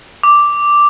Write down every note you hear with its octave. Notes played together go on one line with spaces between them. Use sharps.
D6